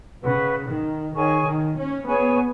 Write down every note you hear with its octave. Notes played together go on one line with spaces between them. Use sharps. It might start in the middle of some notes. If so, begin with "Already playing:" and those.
C#3 B4 F#5 C#6
D#3
D#3 G#4 C#5 G#5 C#6
D#3
C#4
B3 G#4 C#5 G#5 C#6